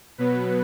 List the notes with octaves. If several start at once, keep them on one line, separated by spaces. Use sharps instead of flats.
B2 F#3 B3 B4